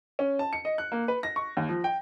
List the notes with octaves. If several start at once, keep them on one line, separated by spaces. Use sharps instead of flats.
C#4
A5
C#7
D#5
F#6
A#3
B4
A#6
C#6
D#2
F3
G5